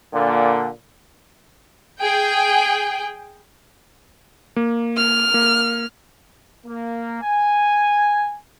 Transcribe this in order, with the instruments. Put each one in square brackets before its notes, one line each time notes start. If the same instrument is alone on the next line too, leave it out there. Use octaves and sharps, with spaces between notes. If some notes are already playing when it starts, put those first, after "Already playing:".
[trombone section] A#2 D3
[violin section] G#4 G5
[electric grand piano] A#3
[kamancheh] F6
[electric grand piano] A#3
[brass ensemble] A#3
G#5